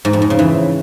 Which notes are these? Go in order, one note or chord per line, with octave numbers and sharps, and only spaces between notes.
G#2
F2
G#2
C#3
E3